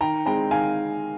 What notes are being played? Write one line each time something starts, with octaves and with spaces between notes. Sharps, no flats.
D#3 G5 A#5
G#3 C4 G5 A#5
D#3 F5 G#5